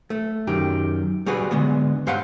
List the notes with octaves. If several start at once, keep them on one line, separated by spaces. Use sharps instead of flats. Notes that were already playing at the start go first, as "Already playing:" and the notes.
A3
F#2 D#3 G4
G3 F#4 G#4 B4
D3 G#3 B3
G2 C5 F5 F#5 C6